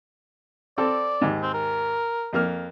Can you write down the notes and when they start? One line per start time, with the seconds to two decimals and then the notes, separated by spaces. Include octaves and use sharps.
0.78 C4 A4 D5
1.21 D#2 G#2
1.42 C4
1.54 A#4
2.33 F2 A#3 F6